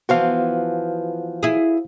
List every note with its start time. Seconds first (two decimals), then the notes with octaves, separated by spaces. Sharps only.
0.09 E3 F3 B3 F#4 C5 F5
1.43 E4 G#4